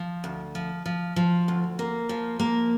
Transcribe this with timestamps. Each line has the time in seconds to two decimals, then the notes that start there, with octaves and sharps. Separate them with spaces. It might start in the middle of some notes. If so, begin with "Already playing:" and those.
Already playing: F3
0.24 D2
0.55 F3
0.86 F3
1.16 F3
1.48 D2
1.79 A#3
2.09 F3
2.40 A#3